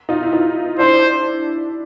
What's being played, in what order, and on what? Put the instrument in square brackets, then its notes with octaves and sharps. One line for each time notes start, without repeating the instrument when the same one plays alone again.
[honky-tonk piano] D#4 F4
E4
D#4 F4
[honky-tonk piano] D4 E4 [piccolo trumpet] C5